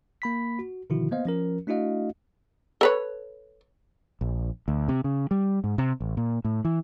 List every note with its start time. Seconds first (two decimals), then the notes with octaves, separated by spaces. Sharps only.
0.22 A#3 B5 B6
0.59 F#4
0.90 B2 D3 D#3 F3 E4 F#4
1.11 A#3 B3 C5 D#5 F5
1.25 F3 C#4 A#4
1.67 A3 D4 E4 F#4 D#5 F5
2.81 A4 B4 C#5
4.21 A#1
4.68 D2
4.88 C3
5.04 C#3
5.31 G3
5.64 G#2
5.78 C3
6.00 A1
6.17 A#2
6.45 A2
6.65 E3